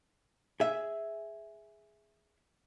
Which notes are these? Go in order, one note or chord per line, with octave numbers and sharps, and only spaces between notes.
G#4 E5